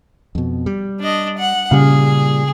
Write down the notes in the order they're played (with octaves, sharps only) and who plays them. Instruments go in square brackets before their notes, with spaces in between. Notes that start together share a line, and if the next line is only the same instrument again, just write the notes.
[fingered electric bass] F2 B2
G3
[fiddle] D4 D#5
F#5
[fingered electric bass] A#2 G3 [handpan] C#3 F5 [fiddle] G#4